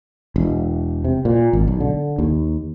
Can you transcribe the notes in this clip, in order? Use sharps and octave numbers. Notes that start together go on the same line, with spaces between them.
E1
C3
A#2
G#1
B1
D3
D#2